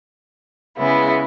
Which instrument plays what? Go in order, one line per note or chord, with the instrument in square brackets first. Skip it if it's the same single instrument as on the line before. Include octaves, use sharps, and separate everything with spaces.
[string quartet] C#3 G#3 B3 E4